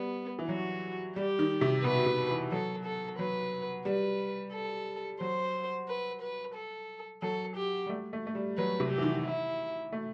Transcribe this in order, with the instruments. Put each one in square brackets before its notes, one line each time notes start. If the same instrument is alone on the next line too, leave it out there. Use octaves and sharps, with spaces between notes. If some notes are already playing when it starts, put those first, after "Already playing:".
Already playing: [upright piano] G3 [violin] B3
[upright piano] E3
[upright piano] F#3 [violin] F#4
[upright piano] G3 [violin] G4
[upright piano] D#3
C3
[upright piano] B2 [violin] B4
[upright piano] C3
E3
[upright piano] F#3 [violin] A4
[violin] A4
[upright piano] F#3 [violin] B4
[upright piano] G3 [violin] B4
[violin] A4
[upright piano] F#3 [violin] C5
[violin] B4
B4
A4
[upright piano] F#3 [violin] A4
[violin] G4
[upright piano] G3
A3
A3
A3
G3
[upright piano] F#3 [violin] B4
[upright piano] C3
[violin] G4
[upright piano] E3
D#3
[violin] E4
[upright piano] A3